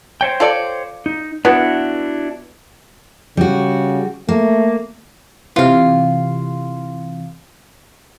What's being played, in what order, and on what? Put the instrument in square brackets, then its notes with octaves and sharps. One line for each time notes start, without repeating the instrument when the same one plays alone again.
[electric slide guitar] C5 C#5 G5
[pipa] F4 A4 D5
[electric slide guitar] D#4
[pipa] B3 [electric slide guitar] D4 E4 F#4
[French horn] C#3 [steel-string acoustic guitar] G3 F#4
[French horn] A3 [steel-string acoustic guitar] A#3
[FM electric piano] C3 E3 [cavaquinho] F4 F5